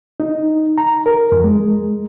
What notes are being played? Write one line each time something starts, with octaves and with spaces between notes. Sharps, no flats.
D#4
A#5
A#4
F2
G#3